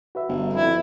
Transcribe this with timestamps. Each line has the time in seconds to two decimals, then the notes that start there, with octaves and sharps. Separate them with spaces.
0.15 F#4 B4 E5
0.29 G1
0.53 F2 E4